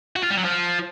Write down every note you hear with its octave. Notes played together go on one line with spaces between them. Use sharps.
F#4
F4
G3
F#3
F3